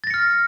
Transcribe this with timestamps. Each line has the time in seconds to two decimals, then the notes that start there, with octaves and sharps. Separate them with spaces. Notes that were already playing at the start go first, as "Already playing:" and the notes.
0.04 A6
0.07 A#6
0.10 C#7
0.14 F6